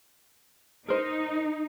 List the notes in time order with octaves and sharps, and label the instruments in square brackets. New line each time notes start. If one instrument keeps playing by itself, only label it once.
[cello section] D#4 [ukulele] A#4 C5